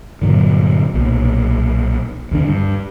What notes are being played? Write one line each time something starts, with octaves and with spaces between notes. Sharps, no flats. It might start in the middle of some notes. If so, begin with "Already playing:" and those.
G2 A#2 D3 F#3
B1 A#2
D#2 D3 D4
G2